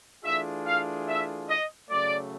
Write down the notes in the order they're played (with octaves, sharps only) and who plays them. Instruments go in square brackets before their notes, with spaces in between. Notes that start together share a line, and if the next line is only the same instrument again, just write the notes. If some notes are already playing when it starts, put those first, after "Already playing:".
[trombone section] E3 A3 D4 F4 G#4 [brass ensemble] E5
[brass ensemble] F5
E5
D#5
[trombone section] C#3 F#3 A3 [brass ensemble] D5